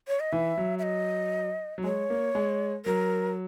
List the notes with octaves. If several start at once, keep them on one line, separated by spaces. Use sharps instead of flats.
C#5
D#5
E3 E5
F#3
E5
D#5
F#3
G#3 C#5
A#3
G#3
F#3 A#4